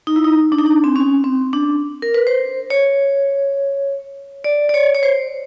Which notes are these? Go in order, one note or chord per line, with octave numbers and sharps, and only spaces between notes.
D#4
E4
D#4
D4
D#4
D4
C4
C#4
C4
D4
A#4
B4
C5
C#5
D5
D5
C#5
C#5
C5